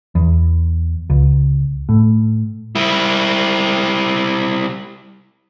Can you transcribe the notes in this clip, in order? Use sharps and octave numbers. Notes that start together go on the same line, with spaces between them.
E2
C#2
A2
G3 E4